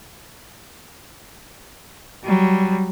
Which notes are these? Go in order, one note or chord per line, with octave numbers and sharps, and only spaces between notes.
F#3 G3